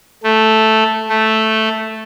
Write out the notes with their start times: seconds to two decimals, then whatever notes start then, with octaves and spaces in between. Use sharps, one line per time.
0.24 A3
1.09 A3